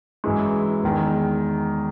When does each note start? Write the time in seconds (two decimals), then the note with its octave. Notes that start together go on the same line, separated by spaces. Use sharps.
0.24 F#2 E3 G#3
0.84 E2 D#3 G#3